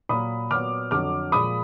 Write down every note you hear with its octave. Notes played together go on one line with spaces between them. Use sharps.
A#2 F#3 A#3 B5 D#6
A#2 F#3 B3 D6 F6
F2 D3 F#3 D6 F6
A#2 F3 G#3 B5 D#6